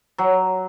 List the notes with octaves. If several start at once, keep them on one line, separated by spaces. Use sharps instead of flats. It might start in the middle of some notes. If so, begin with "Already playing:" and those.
F#3